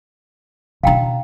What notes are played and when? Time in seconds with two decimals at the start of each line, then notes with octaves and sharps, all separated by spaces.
0.83 B2 D4 F5 G5 A#5